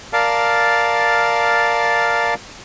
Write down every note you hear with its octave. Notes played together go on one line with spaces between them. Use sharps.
A#4 D5 F5 A5